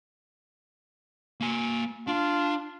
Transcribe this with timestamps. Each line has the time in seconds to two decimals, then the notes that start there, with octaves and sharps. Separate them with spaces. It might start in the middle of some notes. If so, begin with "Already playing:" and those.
1.41 A#3 G#5
2.07 D4 F4